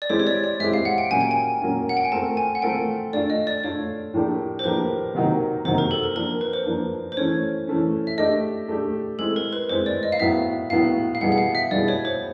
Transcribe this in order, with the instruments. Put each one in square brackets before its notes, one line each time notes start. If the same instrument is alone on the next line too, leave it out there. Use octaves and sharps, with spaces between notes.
[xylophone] D5
[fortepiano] G#3 C4 E4 G4 [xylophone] C#5
[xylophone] C#5
D5
D5
[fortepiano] G#3 C4 E4 G4 [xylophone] E5
[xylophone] F5
F#5
G5
[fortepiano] A#2 F#3 A#3 C#4 F4 [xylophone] G#5
[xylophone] G5
G#5
[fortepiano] A#2 F#3 A#3 C#4 F4
[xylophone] F#5
G5
G#5
[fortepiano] A3 C4 F4 A#4 [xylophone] A5
[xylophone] G#5
F#5
[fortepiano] A3 C4 F4 A#4 [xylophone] G5
[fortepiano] A3 D4 F4 [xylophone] D5
[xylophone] D#5
D5
[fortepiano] A3 D4 F4 [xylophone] C#5
[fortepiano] A2 F3 A#3 D4 G4
[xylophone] C5
[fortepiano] A2 F3 A#3 D4 G4 [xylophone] B4
[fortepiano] C3 D#3 F#3 A#3 D#4
[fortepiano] C3 D#3 F#3 A#3 D#4 [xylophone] C5
[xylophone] A#4
A4
A#4
[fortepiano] F3 A#3 D4 [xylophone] A#4
[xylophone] B4
C5
[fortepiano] F3 A#3 D4
[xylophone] C5
[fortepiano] E3 A3 C#4 [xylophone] C#5
[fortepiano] E3 A3 C#4
[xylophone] E5
[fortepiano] A3 D4 G4 [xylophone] D#5
[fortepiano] A3 D4 G4
[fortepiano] G#3 C4 E4 [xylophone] A4
[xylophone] A#4
B4
[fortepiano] G#3 C4 E4 [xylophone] C5
[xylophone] D5
D#5
F5
[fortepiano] A2 F#3 B3 E4 [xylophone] E5
[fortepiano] A2 F#3 B3 E4 [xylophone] F5
[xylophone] F5
[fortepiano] B2 G3 B3 E4 G#4 [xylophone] F#5
[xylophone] F#5
F5
E5
[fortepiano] B2 G3 B3 E4 G#4 [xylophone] D5
[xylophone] C#5
C5